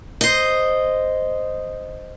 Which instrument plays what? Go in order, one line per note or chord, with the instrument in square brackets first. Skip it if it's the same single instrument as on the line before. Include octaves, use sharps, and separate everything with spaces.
[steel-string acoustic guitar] C5 D#5